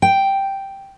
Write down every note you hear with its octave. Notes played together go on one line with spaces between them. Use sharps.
G5